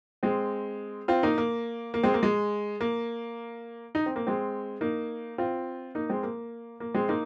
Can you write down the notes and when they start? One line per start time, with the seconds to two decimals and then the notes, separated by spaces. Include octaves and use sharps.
0.23 G#3 C4
1.08 C4 F4
1.23 A#3 D#4
1.38 A#3
1.94 A#3
2.03 G#3 C4
2.14 A#3
2.23 G#3
2.81 A#3
3.95 D#4
4.06 C4
4.16 A#3
4.27 G#3 C4
4.81 A#3 D#4
5.38 C4 F4
5.95 A#3 D#4
6.09 G#3 C4
6.23 A#3
6.80 A#3
6.95 G#3 C4
7.09 A#3 D#4